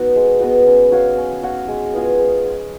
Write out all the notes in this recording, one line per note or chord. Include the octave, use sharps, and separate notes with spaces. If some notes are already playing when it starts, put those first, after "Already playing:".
Already playing: B3 D#4 F#4
G#3
B3 F#4
C#4
F#4 C#5 F5
C#4
F#4 C#5 F5
G#3
B3 F4 G#4
G#3